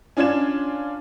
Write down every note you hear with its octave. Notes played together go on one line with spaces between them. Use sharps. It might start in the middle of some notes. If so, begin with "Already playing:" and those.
C#4 D4 F4 D5 G#6 E7